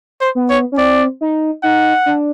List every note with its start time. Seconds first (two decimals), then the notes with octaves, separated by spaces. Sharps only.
0.21 C5
0.35 B3
0.50 C#5
0.72 C#4
0.78 C4 D5
1.21 D#4
1.63 D#4 F#5
2.06 D4